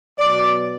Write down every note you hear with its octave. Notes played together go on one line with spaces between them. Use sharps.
B2 F#3 D5